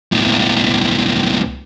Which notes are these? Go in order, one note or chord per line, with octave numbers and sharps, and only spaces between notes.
C#2 A2